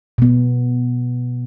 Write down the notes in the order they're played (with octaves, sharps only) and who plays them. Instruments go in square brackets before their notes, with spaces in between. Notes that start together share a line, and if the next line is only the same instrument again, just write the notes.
[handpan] B2 B3